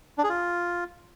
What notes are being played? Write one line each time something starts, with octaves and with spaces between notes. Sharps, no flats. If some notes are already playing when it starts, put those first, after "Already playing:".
D4
G#4
F4